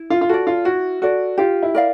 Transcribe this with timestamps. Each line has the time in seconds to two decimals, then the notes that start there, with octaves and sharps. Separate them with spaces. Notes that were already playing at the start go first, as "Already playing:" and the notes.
Already playing: E4
0.10 F4
0.21 F4
0.29 F#4 A4 D5
0.47 F4
0.65 E4 F#4
1.02 F#4 A4 D5
1.38 F4 G4
1.63 E4
1.75 A#4 D5 F5